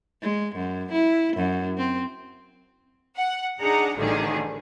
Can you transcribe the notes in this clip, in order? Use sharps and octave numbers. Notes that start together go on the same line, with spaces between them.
G#3
F#2
E4
F#2
C4
F#5
D4 D#4 G#4 F#5 A#5
A1 D2 D3 D#3 G3 G#4